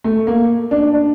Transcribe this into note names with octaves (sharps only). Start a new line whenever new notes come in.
A3
A#3
D4
D4